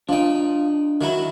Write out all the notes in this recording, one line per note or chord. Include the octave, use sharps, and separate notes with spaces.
F3 D4 D#5 G5
D#3 F#3 E4